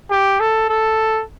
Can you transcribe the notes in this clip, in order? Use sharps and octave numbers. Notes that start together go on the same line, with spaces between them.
G4
A4
A4